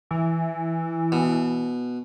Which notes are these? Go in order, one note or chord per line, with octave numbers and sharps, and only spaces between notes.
E3
B2